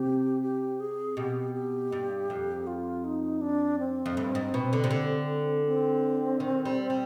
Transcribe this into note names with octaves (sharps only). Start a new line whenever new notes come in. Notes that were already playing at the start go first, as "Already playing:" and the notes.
Already playing: C3 G4
G4
G#4
B2 G4
G4
G2
F2
F4
D#4
D4
C4
F2
G2
G#2
B2
D3
C3
D3
C4
D#3
G3
G3